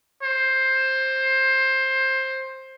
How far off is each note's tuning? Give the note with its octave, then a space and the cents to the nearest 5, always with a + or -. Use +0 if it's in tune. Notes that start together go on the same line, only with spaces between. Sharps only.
C5 +15